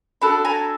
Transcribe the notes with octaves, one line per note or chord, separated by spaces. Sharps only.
D4 F#4 A4 A5 B5
G#5 A#5